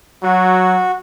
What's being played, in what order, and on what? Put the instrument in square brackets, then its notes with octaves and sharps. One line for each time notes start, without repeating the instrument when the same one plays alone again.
[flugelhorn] F#3 [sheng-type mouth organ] F#4